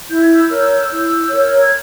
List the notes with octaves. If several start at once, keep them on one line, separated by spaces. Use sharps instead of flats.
E4 G6
G#6
E6 G6
A#4 C#5
E4
A#4 C#5
G#6